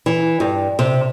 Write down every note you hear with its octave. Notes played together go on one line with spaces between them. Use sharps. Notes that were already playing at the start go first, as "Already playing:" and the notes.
E3
G2
C3